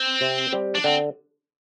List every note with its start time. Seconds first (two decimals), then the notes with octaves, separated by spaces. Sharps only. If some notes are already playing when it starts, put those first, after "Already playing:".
Already playing: C4
0.21 C3
0.52 G3 C4 G4
0.75 D4
0.84 D3 C4